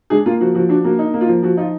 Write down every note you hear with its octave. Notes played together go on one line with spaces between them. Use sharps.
G#3 D4 G#4
A#3 F4
F3 F#4
F3 F#4
D4 F#4
A#3 F#4
D#4
A#3
F4
F3
F3 F#4
D#4 F4